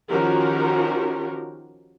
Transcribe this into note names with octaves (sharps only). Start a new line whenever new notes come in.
D#3 F3 C#4 F#4 G4 A#4